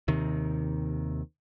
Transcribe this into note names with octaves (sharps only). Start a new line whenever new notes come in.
D#2 C3 D#3